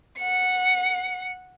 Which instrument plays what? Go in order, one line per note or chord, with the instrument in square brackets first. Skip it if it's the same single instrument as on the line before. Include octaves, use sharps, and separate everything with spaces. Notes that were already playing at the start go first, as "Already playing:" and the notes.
[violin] F#5 C#7